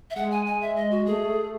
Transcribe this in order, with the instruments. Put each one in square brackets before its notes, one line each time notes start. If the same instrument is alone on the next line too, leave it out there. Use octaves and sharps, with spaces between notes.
[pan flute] E5
[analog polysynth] G#3 [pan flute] F#5
[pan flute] G#5
G#5
E5
D#5
F#4
[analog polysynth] G#3
[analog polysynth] A3 [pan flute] G#4